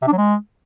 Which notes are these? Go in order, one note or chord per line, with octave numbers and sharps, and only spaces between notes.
C3
D4
F#3
G#3